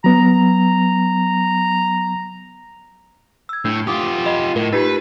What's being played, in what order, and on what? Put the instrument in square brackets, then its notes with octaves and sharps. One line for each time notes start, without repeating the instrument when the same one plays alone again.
[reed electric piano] F#3 B3 [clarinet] A#5
[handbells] E6 G#6
[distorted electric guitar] A2 [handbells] D4
[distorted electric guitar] F4 G4 [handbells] D6 D#6
[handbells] D#5 B5
[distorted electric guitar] A2 [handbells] A#4
[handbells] D#4 F4 G4 [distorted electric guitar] B4